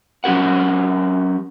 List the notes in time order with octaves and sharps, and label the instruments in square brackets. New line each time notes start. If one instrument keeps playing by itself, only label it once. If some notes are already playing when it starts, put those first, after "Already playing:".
[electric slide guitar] F#3 C#4 G4 A#4 F#5